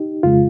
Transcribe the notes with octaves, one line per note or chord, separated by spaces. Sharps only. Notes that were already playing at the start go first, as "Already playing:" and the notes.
Already playing: D#4 G4
F2 C#3 G#3 F4